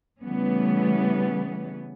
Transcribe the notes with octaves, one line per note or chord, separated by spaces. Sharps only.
C#3 E3 G3 A3 B3 C#4